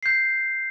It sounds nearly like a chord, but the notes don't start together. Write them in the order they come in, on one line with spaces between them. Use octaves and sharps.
C7 G6 B6